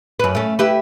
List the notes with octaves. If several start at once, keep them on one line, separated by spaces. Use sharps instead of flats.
F#2 B4
A3 C#4
E4 G4 B4